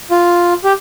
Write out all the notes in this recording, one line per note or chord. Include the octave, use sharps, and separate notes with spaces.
F4
G4